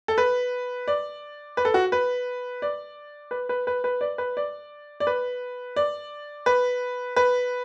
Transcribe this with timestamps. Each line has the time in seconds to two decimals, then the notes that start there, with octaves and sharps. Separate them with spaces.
0.08 A4
0.18 B4
0.88 D5
1.57 B4
1.65 A4
1.74 F#4
1.92 B4
2.62 D5
3.31 B4
3.49 B4
3.67 B4
3.84 B4
4.01 D5
4.18 B4
4.37 D5
5.00 D5
5.07 B4
5.76 D5
6.46 B4
7.16 B4